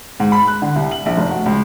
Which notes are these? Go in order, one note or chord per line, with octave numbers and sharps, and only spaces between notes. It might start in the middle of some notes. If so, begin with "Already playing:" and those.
G#2
B5
F#6
D3
C2
F#7
A#1
F1
F#4
C#2